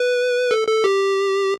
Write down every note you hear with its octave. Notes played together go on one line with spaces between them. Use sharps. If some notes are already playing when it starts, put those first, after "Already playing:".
Already playing: B4
A4
A4
G4